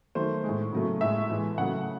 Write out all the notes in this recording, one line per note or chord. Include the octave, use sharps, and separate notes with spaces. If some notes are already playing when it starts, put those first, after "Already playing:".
D#3 F#3 A3 C5
A2 G#3
C#3 F#3 A3
A2 G#3 E5
A2 E3 G#3
C#3 F#3 A3 F#5